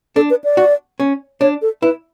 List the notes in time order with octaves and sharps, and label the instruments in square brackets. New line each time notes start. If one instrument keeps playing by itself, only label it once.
[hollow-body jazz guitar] D4 [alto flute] A4
[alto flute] B4
D5
[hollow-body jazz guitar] F#4
C#4
[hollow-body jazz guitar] D4 [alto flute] C#5
[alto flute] A4
[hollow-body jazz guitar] E4 [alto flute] B4